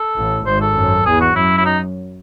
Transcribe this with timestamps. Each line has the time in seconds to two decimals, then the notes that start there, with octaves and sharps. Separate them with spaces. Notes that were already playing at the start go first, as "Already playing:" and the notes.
Already playing: A4
0.17 A1 A2
0.46 G#1 G#2 C5
0.61 A4
0.76 F#2
1.06 E2 G#4
1.21 F#4
1.35 F#2 E4
1.58 E4
1.66 D#4